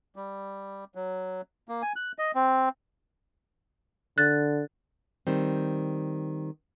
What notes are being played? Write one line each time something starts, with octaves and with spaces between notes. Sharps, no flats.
G3
F#3
A#3
G#5
F#6
D#5
C4
D3 F#6 A6
D#3 G3 C4